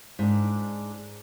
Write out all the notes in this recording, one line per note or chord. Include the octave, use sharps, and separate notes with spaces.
G#2 D4